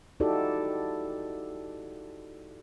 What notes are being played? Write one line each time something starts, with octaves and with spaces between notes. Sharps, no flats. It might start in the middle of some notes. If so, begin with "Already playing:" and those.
D#4 E4 F#4 G4 A4 D5